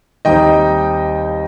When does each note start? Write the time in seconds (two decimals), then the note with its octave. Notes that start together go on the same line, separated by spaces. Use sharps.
0.25 D#2 D#3 G3 C4 D#4 D#5 G5